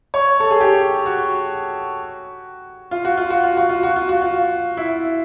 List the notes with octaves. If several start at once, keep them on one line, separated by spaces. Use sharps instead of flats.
C#5
A4
G#4
G4
F#4
F4
F#4
F4
F#4
F4
F#4
F4
F#4
F4
F#4
F4
E4